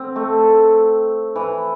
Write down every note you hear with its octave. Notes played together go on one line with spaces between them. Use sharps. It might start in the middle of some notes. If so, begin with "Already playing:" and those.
Already playing: C4
A3
E3